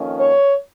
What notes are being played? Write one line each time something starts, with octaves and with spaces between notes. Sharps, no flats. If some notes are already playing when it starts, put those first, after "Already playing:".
Already playing: F2 D#3 A#3 C#4
C#5